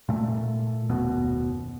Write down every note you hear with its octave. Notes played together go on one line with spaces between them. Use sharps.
A#2 A3
F#1 D#2 B2